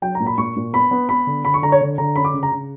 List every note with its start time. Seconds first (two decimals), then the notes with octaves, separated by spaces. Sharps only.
0.02 F#3 G5
0.15 A#5
0.20 A#2
0.26 B5
0.38 A#2 C#6
0.57 A#2
0.73 B3 B5
0.91 B3
1.09 B3 B5
1.27 D3
1.45 D3 B5
1.54 C#6
1.62 D3 A#5
1.72 C#5
1.81 D3
1.98 D3 A#5
2.16 C#4 B5
2.25 D6
2.34 C#3
2.43 A#5
2.52 C#3